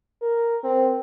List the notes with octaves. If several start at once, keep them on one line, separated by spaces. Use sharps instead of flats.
A#4
C4